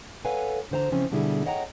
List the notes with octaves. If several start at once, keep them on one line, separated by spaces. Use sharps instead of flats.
A4 B4 C#5 F5 F#5 G#5
D3 E3 C5 F#5 A#5
C#3 E3 F3 C4 C#4 C5
B2 D3 G3 E4 G#4
C#5 D#5 F#5 G5 A5 A#5